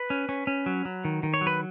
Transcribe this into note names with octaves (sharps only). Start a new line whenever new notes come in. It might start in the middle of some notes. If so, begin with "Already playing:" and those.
Already playing: B4
C#4
C#4
C#4
F#3
F#3
D#3
D#3
C#5
F#3
B4